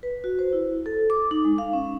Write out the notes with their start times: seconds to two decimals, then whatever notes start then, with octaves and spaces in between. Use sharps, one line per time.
0.03 B4
0.24 F#4
0.39 C5
0.53 E4
0.86 A4
1.10 D6
1.31 D#4
1.45 G#3
1.58 F5
1.73 C#4